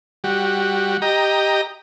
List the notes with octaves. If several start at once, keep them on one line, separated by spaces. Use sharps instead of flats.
G3 F#4
G4 D#5 A#5